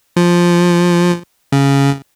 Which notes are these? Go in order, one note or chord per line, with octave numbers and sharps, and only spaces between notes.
F3
C#3